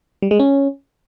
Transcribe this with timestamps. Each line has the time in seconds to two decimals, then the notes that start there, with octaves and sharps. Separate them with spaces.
0.22 G3
0.31 G#3
0.39 C#4